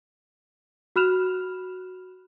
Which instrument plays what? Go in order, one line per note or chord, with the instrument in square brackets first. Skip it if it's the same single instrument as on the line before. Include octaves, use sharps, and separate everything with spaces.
[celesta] F#4 B5 F6 F#6 E7 F7